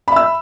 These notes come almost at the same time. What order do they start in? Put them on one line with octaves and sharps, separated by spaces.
B5 E5 E6